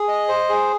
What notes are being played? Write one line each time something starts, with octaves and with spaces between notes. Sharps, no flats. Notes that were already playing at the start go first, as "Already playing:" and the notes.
Already playing: G#4
D#5
C5
G#4